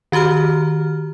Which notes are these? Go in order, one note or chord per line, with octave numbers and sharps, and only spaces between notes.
D#3 F#4 G4 A#5 F6